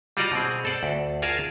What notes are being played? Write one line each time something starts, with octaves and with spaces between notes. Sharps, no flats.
G3 F4 F#4 D5 D#5 A#5
B2 C4 G#4
A4 C5 D5 F#5
D2
F4 G#4 A#4 F5 G#5 A5